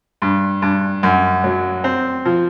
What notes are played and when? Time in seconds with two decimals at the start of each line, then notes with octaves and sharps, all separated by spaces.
0.22 G2
0.62 G2
1.03 F#2
1.44 F#3
1.84 C4
2.26 F3